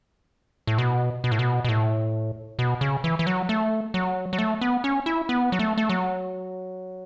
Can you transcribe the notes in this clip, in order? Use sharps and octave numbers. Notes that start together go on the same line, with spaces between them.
A2
B2
B2
A2
B2
B2
A2
B2
C#3
E3
E3
F#3
A3
F#3
F#3
A3
B3
C#4
E4
B3
F#3
A3
A3
F#3